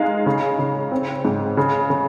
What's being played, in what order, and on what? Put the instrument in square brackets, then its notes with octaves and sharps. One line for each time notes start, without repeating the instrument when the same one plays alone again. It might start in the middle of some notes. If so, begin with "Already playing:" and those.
Already playing: [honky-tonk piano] G#3 D#4 F5 G#5
C#3
C#3
C4
G#2
C#3
C#3